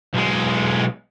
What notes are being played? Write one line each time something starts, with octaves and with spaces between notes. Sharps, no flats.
B1 G#3